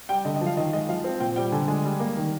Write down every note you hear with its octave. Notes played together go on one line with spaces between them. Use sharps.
G3 G5
D3 D#5
D#5
F3
F5
D#3 D#5
G#3 D#5
F3 F5
C4
A#2 G5
G3 G5
D3 G#5
G#3 G#5
G3
A#3
D#3